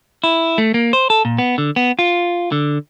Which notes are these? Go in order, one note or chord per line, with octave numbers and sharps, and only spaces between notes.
E4
A3
A#3
C5
A4
A#2
B3
D3
B3
F4
D3